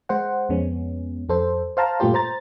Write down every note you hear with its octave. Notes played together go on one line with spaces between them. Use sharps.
G#3 C5 F#5
F2 G#3 B3 C#4
F2 A4 C5
C5 F5 A5 A#5
G2 A#2 A3 F4 G4 C5
C5 A#5 A6